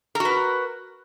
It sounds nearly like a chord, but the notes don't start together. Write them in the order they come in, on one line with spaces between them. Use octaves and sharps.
A#4 F#4 B4